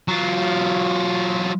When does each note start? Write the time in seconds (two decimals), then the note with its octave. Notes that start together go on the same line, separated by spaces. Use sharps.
0.08 F#3 F4